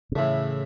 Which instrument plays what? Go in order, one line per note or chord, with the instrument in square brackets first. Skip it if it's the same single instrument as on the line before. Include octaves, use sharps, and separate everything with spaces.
[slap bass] C3
[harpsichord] A2 E3 A3 [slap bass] C#3